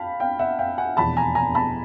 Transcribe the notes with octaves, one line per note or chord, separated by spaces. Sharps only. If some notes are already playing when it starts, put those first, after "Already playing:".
Already playing: F5 G5 A5 B5
F5 G5
E5 F#5
F5 G5
F#5 G#5
F1 E2 B2 A5 B5
G#5 A#5
G#5 A#5
A5 B5